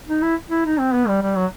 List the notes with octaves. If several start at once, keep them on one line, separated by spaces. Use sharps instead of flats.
D#4
E4
E4
D#4
C4
B3
G3
G3
F#3